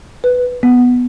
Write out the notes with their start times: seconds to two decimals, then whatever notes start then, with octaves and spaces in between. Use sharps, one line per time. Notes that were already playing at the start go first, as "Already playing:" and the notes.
0.24 B4
0.63 B3